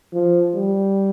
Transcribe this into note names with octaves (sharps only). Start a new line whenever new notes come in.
F3
G3